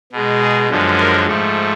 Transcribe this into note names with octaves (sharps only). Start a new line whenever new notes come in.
B2 G#3
G#4
F#2 D3 F3 G#3
A#4
G#2 F3 A3